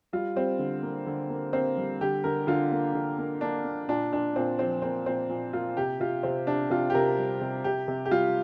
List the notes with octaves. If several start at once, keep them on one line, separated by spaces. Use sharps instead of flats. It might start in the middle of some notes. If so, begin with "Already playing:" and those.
G3 F4
G3 C4
D3
A#3
D3
A#3
A#3 C4
G3
D3 G4
D3 A#4
D3 F4
A#3
D3
A#3
A#3 D4
A#3
A#2 D4
A#2 D4
A#2 C4
F3 C4
A#3 C4
A#2 C4
A#2
A#3 F4
C3 G4
C3 F4
C3 C4
C3 D4
C3 F4
G4
C3 A#4
G3
C3
C3 G4
C3
G4
G3 F4